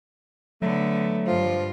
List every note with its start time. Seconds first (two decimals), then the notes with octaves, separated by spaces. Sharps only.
0.62 D3 F#3 A3 B3
1.27 G2 F3 F4